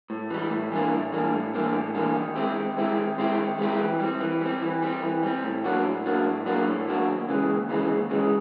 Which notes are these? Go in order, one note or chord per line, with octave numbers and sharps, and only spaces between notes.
A2
E3 G3
A2
E3 G3 A#3 D4
A2
E3 G3 A#3 D4
A2
E3 G3 A#3 D4
A2
E3 G3 A#3 D4
D#3
G#3 C4 E4 G4
D#3
G#3 C4 E4 G4
D#3
G#3 C4 E4 G4
D#3
G#3 C4 E4 G4
E3
G3 C4
E3
G3 C4
E3
G3 C4
E3
G3 C4
A2
F#3 A#3 D4 F#4
A2
F#3 A#3 D4 F#4
A2
F#3 A#3 D4 F#4
A2
F#3 A#3 D4 F#4
D#2
C#3 E3 G#3
D#2
C#3 E3 G#3
D#2
C#3 E3 G#3